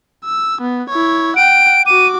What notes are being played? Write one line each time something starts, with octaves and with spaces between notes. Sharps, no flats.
E6
B3
E4 C#5
F#5 G5 D7
F#4 D6 D#7